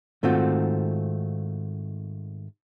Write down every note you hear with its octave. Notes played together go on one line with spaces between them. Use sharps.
G#2 D#3 A3 C4 F4 F#4